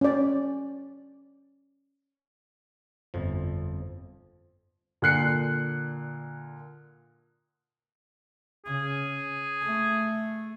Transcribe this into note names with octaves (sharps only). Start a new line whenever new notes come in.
C#4 D5
G1 F2 F3
A#2 D3 F#6 C7 C#7
C#3 G#4
A3